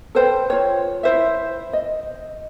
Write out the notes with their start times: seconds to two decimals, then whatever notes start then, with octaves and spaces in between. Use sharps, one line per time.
0.15 A4 B4 C5 G5
0.50 F4 C#5
1.03 E4 C5 E5
1.73 D#5